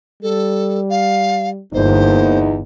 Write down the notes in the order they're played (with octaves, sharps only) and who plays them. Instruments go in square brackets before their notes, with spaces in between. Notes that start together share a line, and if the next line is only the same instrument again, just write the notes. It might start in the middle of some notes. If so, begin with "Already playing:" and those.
[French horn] G3 [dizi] A4
[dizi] F5
[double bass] G1 [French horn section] E2 D#4 [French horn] A#3 [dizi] C5